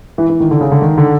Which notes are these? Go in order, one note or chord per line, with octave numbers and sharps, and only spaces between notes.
E3
E3
D#3
D3
C#3
D3
D#3
D3